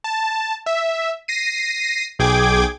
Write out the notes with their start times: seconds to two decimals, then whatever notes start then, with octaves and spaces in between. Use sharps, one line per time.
0.04 A5
0.66 E5
1.28 A#6 C7 D#7
2.19 B1 G#4 G5 D6 G#6